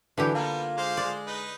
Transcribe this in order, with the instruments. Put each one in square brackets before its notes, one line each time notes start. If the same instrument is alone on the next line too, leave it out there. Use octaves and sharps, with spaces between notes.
[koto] D3 E4 G4 [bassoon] E3 [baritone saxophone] F#3
[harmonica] G3 B3 [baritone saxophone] A#3 [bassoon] F4
[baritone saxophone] G#3 [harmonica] C5 F5 D6
[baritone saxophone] G#3 [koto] D5
[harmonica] D#4 B4